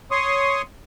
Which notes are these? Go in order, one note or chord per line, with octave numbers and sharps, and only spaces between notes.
C#5 C6 C#6 D#6